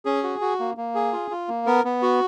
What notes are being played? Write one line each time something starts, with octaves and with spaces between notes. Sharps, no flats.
C#4 G#4
F#4
F#4
A#3
A#3
G#4
F4
F4
A#3
B3 A#4
B3
F#4